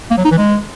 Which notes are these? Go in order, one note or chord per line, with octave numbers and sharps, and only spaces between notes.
A#3
F#3
D#4
E3
G#3